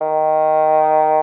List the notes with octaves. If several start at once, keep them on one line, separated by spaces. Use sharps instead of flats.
D#3